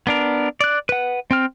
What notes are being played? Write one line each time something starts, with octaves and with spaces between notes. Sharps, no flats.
B3 D4 A#4
D5 F#6
B4 F#5
C4 G5 F6